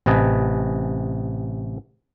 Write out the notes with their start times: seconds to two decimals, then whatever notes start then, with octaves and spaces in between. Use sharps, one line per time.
0.06 A1 C3 B4 D#5 G#5 A5